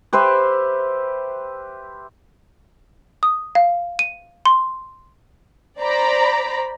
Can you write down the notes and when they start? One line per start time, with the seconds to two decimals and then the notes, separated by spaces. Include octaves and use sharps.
0.13 G4 B4 C5 E5
3.23 D#6
3.55 F5
3.99 D#7
4.45 C6
5.80 C5 D5 A#5 B5